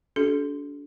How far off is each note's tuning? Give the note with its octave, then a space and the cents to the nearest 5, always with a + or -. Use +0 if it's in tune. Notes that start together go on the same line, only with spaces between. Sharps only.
D4 -30 F#4 +30 A4 -35